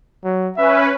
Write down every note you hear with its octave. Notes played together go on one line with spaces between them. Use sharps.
F#3
C#4 B4 E5